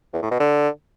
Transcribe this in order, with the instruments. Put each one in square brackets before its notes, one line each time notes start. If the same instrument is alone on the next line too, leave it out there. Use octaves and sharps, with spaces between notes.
[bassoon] E2
A2
B2
D3